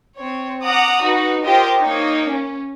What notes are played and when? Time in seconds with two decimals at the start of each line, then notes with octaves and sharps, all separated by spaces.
0.17 C4 C#5
0.64 F#5 A#5 D6 D#6
1.03 D#4 F#4 B4
1.44 F4 G4 A#4 C5 D#5
1.81 A#3 D#4 C#5
2.30 C#4